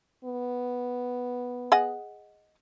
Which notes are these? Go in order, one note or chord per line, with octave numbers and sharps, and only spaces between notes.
B3
G#4 D#5 F#5